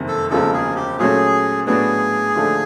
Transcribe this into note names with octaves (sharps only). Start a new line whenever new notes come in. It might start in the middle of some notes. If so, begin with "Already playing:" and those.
Already playing: F#1 F2 C3 D#3
A4
E1 D#2 C#3 F3 A4
G#4
G4
A#2 F#3 A3 C#4 G#4
A2 F#3 B3 D4 F#4 G#4
D#2 D3 F3 A3 D4